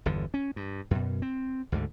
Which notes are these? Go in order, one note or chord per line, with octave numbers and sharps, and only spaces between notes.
G1 E2 D3
C#4
G2
F#2 B2
C4
D2 G#2 D3